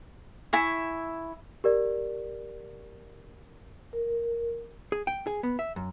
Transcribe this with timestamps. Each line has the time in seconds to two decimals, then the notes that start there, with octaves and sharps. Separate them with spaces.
0.53 E4 E5 G#5 C#6
1.64 G4 A#4 D5
3.93 A#4
4.92 G#4
5.07 G5
5.27 G#4
5.43 B3
5.59 E5
5.76 F#2